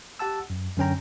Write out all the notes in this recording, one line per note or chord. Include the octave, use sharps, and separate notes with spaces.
G4 F#5 A5 E6
F#2
F#2 D3 C#4 G5 A#5